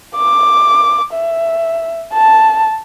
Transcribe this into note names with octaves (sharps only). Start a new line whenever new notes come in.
D6
E5
A5